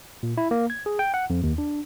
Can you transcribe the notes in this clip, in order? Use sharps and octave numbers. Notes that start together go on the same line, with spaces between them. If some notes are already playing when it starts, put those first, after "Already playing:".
A#2
E4
A#3
G#6
G#4
G5
F#5
F2
D#2
D4